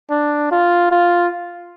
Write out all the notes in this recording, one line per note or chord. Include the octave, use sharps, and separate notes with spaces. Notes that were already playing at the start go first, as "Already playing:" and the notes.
D4
F4
F4